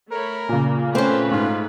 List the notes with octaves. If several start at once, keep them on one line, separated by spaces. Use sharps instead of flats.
A3 A#4 C#5 B5
A#2 C#3 A#3
A3 C4 C#4 B4 C5
G#2 F4